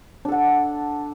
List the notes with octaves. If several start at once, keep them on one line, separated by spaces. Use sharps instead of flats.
D4 A4 F#5